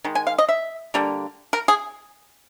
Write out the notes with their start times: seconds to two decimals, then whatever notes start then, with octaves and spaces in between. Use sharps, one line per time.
0.04 D#3 G#3
0.15 G#5
0.27 F5
0.38 D#5
0.49 E5
0.94 D3 G3 A#3
1.53 A#4
1.68 G#4